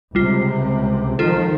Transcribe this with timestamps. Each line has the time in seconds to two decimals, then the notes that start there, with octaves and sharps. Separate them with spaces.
0.15 C#2 C3 G3 F4
1.19 D#3 F3 F4 A4